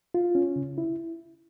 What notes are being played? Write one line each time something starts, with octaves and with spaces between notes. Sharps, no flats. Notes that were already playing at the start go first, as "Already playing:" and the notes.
F4
C#4
C#3
E4